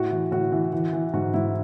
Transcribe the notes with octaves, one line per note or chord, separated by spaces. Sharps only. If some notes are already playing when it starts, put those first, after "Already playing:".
Already playing: A2 F#4
E3
A2 F#4
E3
E3
E3
G#2 F#4
G#2 E4